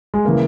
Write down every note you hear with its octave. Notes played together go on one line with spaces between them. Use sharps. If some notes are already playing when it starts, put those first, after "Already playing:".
G#3
C#3 E3 A#3